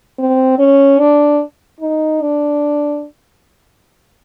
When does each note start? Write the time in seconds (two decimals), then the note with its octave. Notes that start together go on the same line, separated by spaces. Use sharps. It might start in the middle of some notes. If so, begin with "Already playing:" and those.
0.19 C4
0.59 C#4
0.99 D4
1.81 D#4
2.21 D4